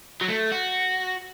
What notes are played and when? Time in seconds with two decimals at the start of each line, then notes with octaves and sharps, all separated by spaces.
0.21 F#3
0.28 A3
0.52 F#4